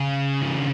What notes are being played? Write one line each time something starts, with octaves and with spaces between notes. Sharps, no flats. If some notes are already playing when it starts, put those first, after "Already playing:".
Already playing: C#3
F3
E3
D#3